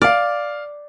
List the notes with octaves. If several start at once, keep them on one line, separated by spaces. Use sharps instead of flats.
D5 F5 F6